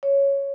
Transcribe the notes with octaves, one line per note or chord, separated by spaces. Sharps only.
C#5